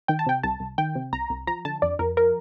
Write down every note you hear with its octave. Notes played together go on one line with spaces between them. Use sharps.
D#3 G5
A5
C3 G5
C2 A5
C2
D#3 G5
C3
C2 A#5
C2
F3 A#5
D3 A5
F2 D5
F2 A#4
F3 A#4